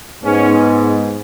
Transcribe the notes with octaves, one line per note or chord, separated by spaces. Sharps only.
G#2 G#3 B3 C#4